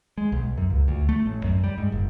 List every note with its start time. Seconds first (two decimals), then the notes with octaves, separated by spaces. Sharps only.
0.18 G#3
0.32 B1
0.57 F#2
0.70 C#2
0.88 D2
1.09 A3
1.26 A1
1.44 F#2
1.64 G3
1.78 G#2
1.92 F#1